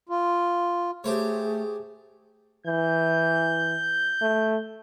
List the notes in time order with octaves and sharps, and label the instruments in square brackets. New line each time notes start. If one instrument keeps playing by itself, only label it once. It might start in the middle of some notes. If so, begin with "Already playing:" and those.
[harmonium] F4
[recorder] A3 [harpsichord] G4 C5 C#5 [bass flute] G#4
[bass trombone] E3 [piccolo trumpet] G6
[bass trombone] A3